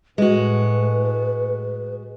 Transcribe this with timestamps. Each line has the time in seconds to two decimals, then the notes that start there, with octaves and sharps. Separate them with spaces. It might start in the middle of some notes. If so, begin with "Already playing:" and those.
0.18 A2 G#3 F#4 B4